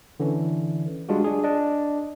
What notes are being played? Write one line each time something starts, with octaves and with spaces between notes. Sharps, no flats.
D3 E3 C#4
G3 G#3 D4 F4 F#4
D4 G#4
D4 D#5